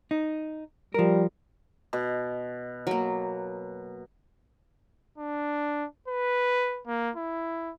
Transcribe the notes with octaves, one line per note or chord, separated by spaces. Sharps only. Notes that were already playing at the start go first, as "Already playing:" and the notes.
D#4
F3 G3 A#4
B2
F#3 A#3
D4
B4
A#3
E4